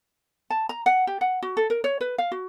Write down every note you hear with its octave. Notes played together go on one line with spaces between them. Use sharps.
A5
A#5
F#5
G4
F#5
F#4
A4
A#4
C#5
B4
F5
F#4